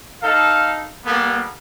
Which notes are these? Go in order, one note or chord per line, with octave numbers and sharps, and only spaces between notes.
D#4 A4 F5
G3 A#3 B3 A4